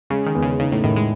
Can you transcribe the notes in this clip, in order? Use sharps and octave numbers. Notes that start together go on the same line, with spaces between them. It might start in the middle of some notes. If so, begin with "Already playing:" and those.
C#3 G#3
D#3
E2
C#3
C#3 D#4
A2
A2 D#3
G#3